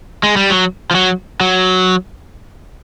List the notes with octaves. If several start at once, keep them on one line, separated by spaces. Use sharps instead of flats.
G#3
G3
F#3
F3
F#3
F#3